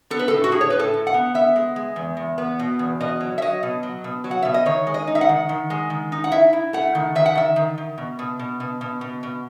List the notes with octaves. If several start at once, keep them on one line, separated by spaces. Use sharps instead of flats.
B3 A4
B4
A2 A4
F#4
A2 G#4
C#5
A2 B4
A4
A2
F#5
B3
B3 E5
G#3
G#3
E2
E2
B3
B2
E2
B2 D#5
F#3
E5
F#3 D#5
B2
F#3
B2
F#3
F#5
B2 E5
D#5
D#3 C#5
G#3
D#5
D#4
E5
F#5
D#3
D#3
G#3
D#3
D#4
F#5
E4 E5
E4
A3 F#5
D#3
D#3 E5
F#5
D#3 E5
D#3
D#3
B2
B2
B2
B2
B2
B2
B2